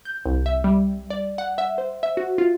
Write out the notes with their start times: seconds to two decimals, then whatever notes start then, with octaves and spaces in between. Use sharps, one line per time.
0.05 G6
0.26 C2
0.46 E5
0.64 G3
1.10 D5
1.38 F#5
1.58 E5
1.78 C5
2.03 E5
2.17 F#4
2.38 F4